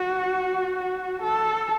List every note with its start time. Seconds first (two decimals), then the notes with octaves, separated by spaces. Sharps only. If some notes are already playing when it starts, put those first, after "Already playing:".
Already playing: F#4
0.76 F#4
1.23 A4